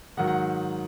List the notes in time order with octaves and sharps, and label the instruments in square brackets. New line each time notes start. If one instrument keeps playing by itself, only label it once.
[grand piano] G#2 D#3 F#3 F#5
F#5